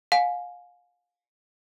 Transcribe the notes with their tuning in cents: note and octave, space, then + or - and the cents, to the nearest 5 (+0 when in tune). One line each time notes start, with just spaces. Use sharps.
F5 +30 G#5 +20